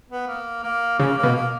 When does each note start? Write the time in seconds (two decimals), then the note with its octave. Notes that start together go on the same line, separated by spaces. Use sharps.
0.10 B3
0.28 A#3
0.64 A#3
0.99 C#3 A#3
1.18 A#3
1.23 B2
1.36 A#3